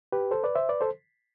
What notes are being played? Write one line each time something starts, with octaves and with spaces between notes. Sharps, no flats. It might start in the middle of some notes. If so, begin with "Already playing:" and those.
G4 B4
A4 C5
B4 D5
C5 E5
B4 D5
A4 C5